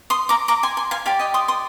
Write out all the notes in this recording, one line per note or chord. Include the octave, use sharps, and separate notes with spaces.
C6 D#6
A#5 D6
A#5 D6
G#5 C6
G#5 C6
F5 G#5
G4 D5 F5 G#5
D#5 G5
C6 D#6
C6 D#6